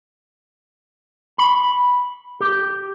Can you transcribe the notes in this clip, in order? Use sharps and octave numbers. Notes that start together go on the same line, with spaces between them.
B5
G4